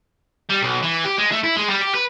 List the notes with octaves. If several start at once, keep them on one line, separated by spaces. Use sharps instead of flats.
G3
B1
E3
G4
G#3
A3
E4
G#3
G3
G4
B4